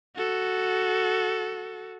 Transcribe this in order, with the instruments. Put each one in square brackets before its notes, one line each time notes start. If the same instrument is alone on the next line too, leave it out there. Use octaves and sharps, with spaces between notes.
[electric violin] F#4 A4